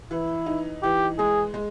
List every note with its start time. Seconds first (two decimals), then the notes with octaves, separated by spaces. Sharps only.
0.11 E3 E4
0.46 D#4
0.83 E3 G4
1.19 G#3 G#4
1.54 G#3